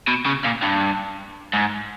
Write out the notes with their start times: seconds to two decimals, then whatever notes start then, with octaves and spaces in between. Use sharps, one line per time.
0.08 B2
0.26 C#3
0.44 A#2
0.62 G2
1.53 G#2